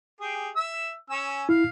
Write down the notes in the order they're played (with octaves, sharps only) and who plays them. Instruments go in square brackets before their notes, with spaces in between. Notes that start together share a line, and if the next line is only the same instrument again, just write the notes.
[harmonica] G4 G#4
E5 E6
C#4 G#5 E6
[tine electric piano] E4 [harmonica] F5